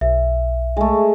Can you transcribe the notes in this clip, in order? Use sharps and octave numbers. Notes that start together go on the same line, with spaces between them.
B1 E5
G#3 A3